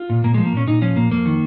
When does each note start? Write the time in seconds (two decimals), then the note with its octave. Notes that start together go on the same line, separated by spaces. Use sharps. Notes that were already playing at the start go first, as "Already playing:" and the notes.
Already playing: F4
0.09 A#2
0.24 A#2 A#3
0.34 F3 G#3
0.45 A#3
0.53 A#2 C#4
0.67 A#2 D#4
0.82 F3 C#4
0.96 A#2 A#3
1.11 F2 A#3
1.25 D#3